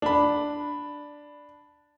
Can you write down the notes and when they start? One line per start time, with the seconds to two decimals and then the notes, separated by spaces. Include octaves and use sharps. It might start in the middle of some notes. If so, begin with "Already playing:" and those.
0.02 D4 B5